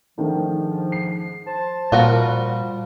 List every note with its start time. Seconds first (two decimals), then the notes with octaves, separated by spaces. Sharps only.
0.18 G#2 D#3 F3 A3 D4
0.92 C7
1.47 C5 A5
1.92 A#2 F3 G3 F4 F#4 A#4